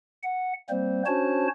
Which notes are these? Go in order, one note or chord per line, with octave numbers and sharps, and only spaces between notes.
F#5
G3 A#3 C4 C5
C#4 D4 F#4 C5 C#5 A5